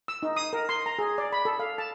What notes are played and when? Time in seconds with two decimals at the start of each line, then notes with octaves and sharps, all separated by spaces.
0.08 E6
0.23 D#4
0.36 D#6
0.53 A#4
0.69 C6
0.86 A#5
0.99 G#4
1.18 D5
1.33 B5
1.45 A4
1.59 F5
1.78 A5